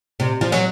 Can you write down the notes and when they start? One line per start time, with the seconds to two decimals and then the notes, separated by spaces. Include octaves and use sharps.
0.20 C3
0.41 F3
0.52 F#3